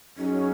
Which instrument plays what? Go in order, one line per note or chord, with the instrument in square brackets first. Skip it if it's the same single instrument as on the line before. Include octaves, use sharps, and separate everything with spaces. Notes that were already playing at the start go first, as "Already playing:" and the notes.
[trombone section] F#2 F#3 D#4 G#4 [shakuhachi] C#4